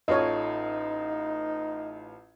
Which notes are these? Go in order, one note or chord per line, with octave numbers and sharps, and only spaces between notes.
A1 D#4 F4 A4 C#5 D#5